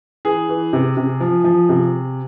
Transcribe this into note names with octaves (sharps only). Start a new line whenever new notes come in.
E3 G#4
E3
C3
C3
F3
F3
C3